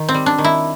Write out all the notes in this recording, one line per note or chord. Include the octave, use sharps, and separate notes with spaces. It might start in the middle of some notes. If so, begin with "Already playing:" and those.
Already playing: D#3
C4
G3
D4
D#3
E4